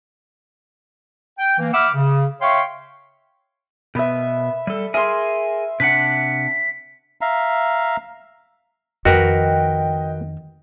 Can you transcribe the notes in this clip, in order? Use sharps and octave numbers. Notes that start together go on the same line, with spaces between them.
G5
E3 A#3
E5 F#5 B5 D6 E6 F6
C#3
C#5 E5 F5 G5 C6 C#6
B2 B3 B4 E5
G3 A4
G#4 A#4 E5 G#5 C6
C3 D4 F#5 B6
E5 F5 A#5
F2 D#3 F#4 A#4 B4 D#5 G5